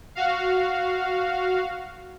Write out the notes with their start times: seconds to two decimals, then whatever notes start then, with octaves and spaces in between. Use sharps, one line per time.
0.15 F#4 F5